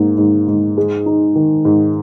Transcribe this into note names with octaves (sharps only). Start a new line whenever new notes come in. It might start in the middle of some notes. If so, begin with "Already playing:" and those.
Already playing: G#2 A#3
G#2
G#2
G#3
D#4
D#3
G#2